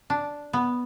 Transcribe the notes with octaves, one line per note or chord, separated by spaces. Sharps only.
D4
B3